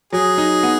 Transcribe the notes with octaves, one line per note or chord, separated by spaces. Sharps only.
F#3 G#4
D#4
B3